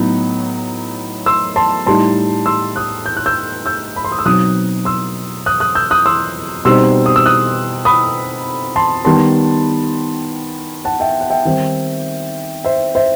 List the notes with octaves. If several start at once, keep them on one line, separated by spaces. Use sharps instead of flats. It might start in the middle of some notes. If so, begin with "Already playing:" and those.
Already playing: A2 F#3 B3 D#4
C6 E6
A5 C6
A2 G3 D#4 A5 C6
C6 E6
D#6 F#6
G6
F#6
E6 G6
E6 G6
B5
C6
D#6
E6
B2 F#3 C4 D#4 D#6 F#6
C6 E6
D#6 F#6
D#6 F#6
E6 G6
D#6 F#6
C6 E6
B2 G3 C4 D#4 C6 E6
D#6
E6
D#6 F#6
B5 D#6
A5 C6
D#3 G3 B3 A5 C6
F#5 A5
E5 G5
F#5
E5 G5
D#3 G3 C4 D#4
C5 E5
C5 E5